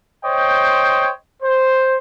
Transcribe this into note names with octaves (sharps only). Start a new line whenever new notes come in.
C5 C#5 D#5 G5
C5